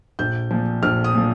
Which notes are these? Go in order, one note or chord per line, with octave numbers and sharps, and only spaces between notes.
A#1 G6
A#2 F3
A#1 F6
D#6
A#2 F3